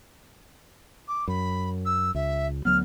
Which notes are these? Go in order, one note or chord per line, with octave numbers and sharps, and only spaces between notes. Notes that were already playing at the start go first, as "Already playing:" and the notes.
D6
F#2 B5
E6
C#2 E5
D2 F#3 B3 F6